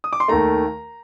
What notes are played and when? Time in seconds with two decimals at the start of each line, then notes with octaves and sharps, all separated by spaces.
0.04 D#6
0.13 D6
0.20 C6
0.28 D#2 D#3 A3 A#5